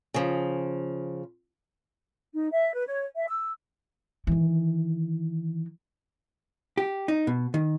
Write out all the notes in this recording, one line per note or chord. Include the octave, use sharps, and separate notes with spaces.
C#3 F3
D#4
E5
B4
C#5
E5
E6
D#3 E3
G4
D#4
B2
D#3